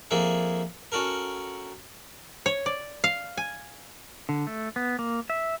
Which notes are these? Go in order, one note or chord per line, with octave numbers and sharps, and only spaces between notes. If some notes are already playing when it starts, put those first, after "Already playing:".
F2 A#3 G#4 E5 F#5
C#4 F#4 A4 A#4
C#5
D5
F5
G#5
D3
A3
B3
A#3
E5